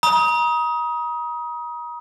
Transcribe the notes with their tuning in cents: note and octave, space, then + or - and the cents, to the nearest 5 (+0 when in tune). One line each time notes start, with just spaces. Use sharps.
A#5 +40 D#6 +20